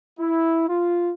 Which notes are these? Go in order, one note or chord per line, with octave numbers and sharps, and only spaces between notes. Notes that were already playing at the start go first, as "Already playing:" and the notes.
E4
F4